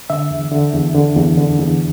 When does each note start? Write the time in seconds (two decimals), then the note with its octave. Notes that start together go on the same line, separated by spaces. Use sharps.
0.10 D3 E5
0.31 E2
0.52 D3
0.73 E2
0.95 D3
1.17 E2
1.38 D3
1.59 E2